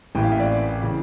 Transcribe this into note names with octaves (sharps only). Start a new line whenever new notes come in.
A1 A2 E3 A#3 E4 G5
F5
E5
D5
C#3 E3